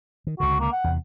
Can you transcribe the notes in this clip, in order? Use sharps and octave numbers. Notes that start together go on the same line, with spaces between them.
D#3
C#2 D3 F#4
A#3
F#5
E2 C3